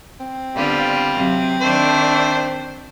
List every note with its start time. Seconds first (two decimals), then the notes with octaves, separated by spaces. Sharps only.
0.20 C4
0.56 D3 G3 B3 F4
1.14 C3 F#3
1.61 D#3 A3 D4 C5